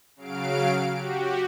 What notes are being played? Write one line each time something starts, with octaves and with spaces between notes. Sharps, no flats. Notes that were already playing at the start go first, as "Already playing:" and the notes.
C#3 F#3 F5 D7
F#4 G4